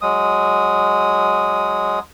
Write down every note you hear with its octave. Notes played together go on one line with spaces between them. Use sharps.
F#3 G#3 D#6